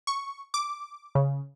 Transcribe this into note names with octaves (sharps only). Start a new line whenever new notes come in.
C#6
D6
C#3